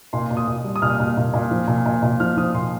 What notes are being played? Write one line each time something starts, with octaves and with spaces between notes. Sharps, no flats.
A#2 C6
A#2
D#6
A#2
G3
D#6
A#2 F6
A#2
A#2
A#2
F3
A#2
A#2
A#2
F3 F6
F3 D#6
A#2 C6